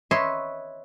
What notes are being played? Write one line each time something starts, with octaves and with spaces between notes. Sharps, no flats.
B4 C#5 D#5 E5 C6